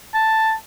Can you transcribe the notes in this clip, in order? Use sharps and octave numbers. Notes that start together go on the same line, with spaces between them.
A5